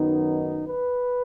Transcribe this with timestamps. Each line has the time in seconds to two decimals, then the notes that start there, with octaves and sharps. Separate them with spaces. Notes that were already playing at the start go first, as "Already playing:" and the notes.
Already playing: F#2 D#3 F#3 B3 D#4
0.66 B4